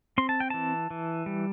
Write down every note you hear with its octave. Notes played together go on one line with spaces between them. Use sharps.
C4 C6
A5
G5
E3 A5
E3
G3